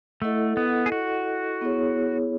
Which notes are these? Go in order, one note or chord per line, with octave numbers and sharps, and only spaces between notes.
A3 E4 A4 D#5 F#5
B3
G#4
F#4
B3 E4 G#4 C#5